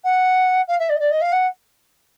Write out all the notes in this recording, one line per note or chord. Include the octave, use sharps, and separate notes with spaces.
F#5
F5
E5
D5
D#5
D5
D#5
F5
F#5